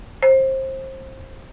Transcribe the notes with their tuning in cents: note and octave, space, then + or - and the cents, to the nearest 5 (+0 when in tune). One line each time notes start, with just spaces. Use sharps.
C5 +25